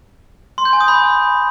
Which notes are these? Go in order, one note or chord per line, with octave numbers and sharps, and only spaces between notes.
C6
G6
G#5
D#6
B5